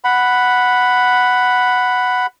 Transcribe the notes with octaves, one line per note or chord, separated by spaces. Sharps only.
F#5 B5